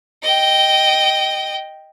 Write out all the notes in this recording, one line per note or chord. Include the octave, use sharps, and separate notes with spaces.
D#5 G5